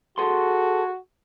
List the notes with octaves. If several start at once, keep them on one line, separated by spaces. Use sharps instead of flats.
F#4 G#4 A4 C6